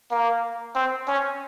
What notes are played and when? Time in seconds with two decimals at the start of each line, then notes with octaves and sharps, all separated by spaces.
0.11 A#3
0.75 C4
1.08 C#4